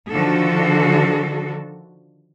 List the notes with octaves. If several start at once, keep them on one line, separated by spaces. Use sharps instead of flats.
D3 D#3 F3 D4 F#4 A4